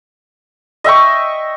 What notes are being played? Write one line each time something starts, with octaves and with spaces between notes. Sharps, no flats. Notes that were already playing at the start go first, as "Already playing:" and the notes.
D#5 E5 G5 C#6